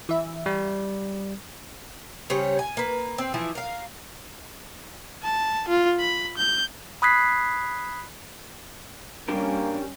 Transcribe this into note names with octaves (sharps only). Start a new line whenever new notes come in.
E3 E5
G3
C#3 G3 C5 C#5
G#5
A#3 B4
C4
E3 F3 E4
A#4 F5
A5
F4
B5
G6
B5 D#6 F#6 G#6 B6 C7
G3 A#3 C#4 D4 G4 A#4